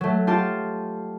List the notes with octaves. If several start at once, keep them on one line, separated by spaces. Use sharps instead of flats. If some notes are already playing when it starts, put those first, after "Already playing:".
F#3 A3
F4 G4 A5